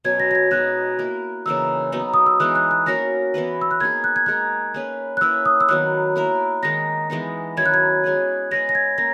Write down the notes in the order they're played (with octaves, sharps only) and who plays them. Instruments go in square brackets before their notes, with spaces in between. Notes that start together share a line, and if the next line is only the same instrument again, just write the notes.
[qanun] B2 F#3 C#4 [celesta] G#6
[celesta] A#6
A#6
G#6
[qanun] B2 G#3 D#4 F#4 [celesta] F#6
[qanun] A#3 E4 A#4
[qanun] C#3 E3 A#3 D#4 [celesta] E6
[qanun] F#3 B3 D#4
[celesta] D#6
E6
[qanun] E3 G#3 B3 D#4 [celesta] F#6
[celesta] F#6
F#6
[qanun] A#3 C#4 F#4 A#4 [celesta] A#6
[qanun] E3 B3 E4 B4
[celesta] E6
F#6
[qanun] A#3 D#4 G#4 [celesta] G#6
[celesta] F#6
G#6
[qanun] G#3 D#4 A#4 [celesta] F#6
[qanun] A#3 C#4 G#4 B4
[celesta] F#6
[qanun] A#3 C#4 E4 B4 [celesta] E6
[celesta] D#6
E6
[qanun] D#3 F#3 B3 [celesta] F#6
[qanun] A#3 E4 A#4
[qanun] D#3 G#3 D#4 [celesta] A#6
[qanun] E3 G#3 B3 D#4
[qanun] D#3 F#3 C#4 E4 [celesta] G#6
[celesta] F#6
G#6
[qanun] G#3 C#4 G#4 B4
[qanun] G#3 C#4 G#4 B4 [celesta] A#6
[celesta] A#6
G#6
[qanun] A#3 C#4 [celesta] A#6